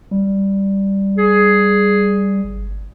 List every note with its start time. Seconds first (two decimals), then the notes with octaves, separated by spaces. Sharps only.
0.11 G3
1.18 G#4
2.44 G1